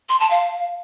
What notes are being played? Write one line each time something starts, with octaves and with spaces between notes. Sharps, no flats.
C6
A5
F5